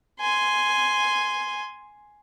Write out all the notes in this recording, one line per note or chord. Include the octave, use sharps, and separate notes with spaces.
G#5 C6